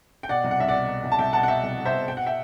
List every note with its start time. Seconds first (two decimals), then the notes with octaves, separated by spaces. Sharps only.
0.23 G5
0.29 B2 D5 F#5
0.44 C2
0.51 F#5
0.59 C2 E5
0.69 D5 F#5
0.74 B2
0.88 B2
1.04 C2
1.12 A5
1.19 C2 E5 G5
1.33 B2 F#5 A5
1.43 F#5
1.48 B2 E5 G5
1.63 C2
1.78 C2
1.85 C5 E5
1.93 B2
2.08 B2 G5
2.17 F#5
2.26 E5 G5